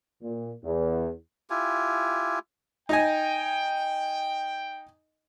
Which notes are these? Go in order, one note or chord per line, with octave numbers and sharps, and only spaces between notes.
A#2
E2
E4 F4 G4 G#5
D#4 D#5 G5 G#5